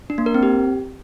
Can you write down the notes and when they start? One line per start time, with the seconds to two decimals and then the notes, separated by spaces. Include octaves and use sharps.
0.10 D4
0.18 A#3
0.26 A#4
0.34 C4
0.43 G4